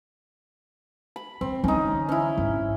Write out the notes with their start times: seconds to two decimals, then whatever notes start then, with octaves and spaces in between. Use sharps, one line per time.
1.16 B5
1.41 D#3 C4
1.64 D3 E3 C#4 D#4
2.09 C#4 E4
2.37 G#1